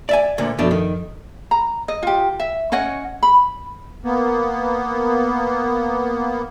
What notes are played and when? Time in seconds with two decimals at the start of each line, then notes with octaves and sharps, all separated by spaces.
0.09 D5 E5 G#5
0.38 D2 A#2 D3
0.58 F#2 B2 F3 A3 D4 A4
0.71 D#3
1.51 A#5
1.88 D#5
2.03 F4 G4
2.40 E5
2.72 C#4 C#5 D#5 F#5
3.23 B5
4.04 A#3 B3